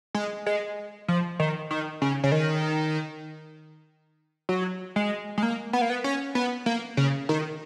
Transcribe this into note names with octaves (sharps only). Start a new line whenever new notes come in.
G#3
G#3
F3
D#3
D#3
C#3
C#3
D#3
F#3
G#3
G#3
A#3
B3
A#3
B3
C#4
B3
A#3
C#3
D#3